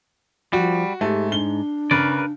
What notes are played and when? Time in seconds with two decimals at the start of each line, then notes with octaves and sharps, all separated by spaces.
0.53 F3 G3 F#4
1.01 G#2 A3 G4
1.32 D4 G7
1.91 C#3 A#4 B4 D5